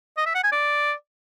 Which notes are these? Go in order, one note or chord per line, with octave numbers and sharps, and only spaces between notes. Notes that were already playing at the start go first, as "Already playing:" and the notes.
D#5
E5
F#5
G#5
D5